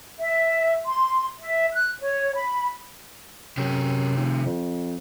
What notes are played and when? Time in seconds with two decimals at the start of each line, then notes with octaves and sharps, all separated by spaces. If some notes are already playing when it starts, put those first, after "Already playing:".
0.19 E5
0.86 C6
1.40 E5
1.73 F#6
1.99 C#5
2.35 B5
3.57 F#2 C3 G4 G#4
4.17 F1
4.45 F2